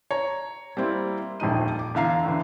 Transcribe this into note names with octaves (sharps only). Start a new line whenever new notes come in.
C#5 A#5
G3 A#3 C4 E4
D#1 A#1 F2 D#4 D#7
D6
E2 D3 E5 F5 A#5 C7
A2 D3 E3